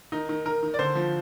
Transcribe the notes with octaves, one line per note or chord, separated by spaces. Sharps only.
D#3 D#4
D#3
D#3 A#4
D#3
D5
D3 C5
F3